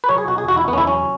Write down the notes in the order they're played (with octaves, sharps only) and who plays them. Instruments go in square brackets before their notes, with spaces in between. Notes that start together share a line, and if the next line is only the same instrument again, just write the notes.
[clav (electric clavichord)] B4
F#3 C#5
G#4
B2 F#4
G#4
E2 F#4
E4
E2 B3
C#4
E4
F#3 C#4